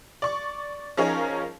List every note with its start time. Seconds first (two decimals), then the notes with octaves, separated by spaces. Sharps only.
0.22 D5 C#6
0.97 F3 C#4 D#4 G#4 A#4 C#5